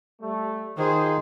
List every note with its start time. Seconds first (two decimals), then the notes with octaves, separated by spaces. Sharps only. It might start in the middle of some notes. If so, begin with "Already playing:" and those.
0.21 G3 A3
0.78 D#3 F4 G#4 C5